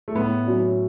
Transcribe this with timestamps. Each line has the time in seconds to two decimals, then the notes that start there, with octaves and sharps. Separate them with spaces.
0.08 A3
0.15 A2 B3
0.47 F#3 C#4